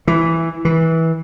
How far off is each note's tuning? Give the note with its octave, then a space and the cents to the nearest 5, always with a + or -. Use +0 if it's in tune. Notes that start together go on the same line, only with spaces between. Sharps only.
E3 +0
E3 -20